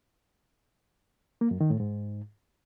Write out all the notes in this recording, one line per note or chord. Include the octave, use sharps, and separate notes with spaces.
A#3
F#2
D#3
A2
G#2